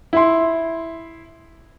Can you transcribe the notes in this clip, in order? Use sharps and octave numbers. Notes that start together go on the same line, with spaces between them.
E4 C6